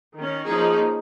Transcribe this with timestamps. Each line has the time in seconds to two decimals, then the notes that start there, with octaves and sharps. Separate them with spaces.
0.16 D#3 C#4
0.48 F3 A#3 C#4 D#4 G#4